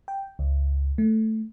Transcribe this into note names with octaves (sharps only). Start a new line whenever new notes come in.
G5
C#2
A3